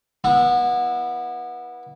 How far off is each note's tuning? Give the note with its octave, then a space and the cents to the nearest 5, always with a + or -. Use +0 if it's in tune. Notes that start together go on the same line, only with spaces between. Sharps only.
B3 -25 E4 -10